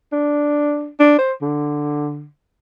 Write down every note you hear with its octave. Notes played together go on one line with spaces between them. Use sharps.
D4
D4
C5
D3